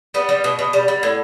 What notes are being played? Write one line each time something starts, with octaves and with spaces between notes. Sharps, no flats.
G3 B3
G3
B2
B2
G3
G3
A2